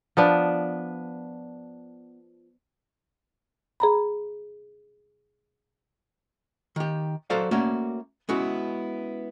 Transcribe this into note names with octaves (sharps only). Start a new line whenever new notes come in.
F3 B3 D4
G#4 A#5 B5
D#3 G4
F#3 F#4 A4 C5 D5 F5
A3 A#3 C#4 F#4 C#5 D5
G#3 B3 C#4 E4 F#4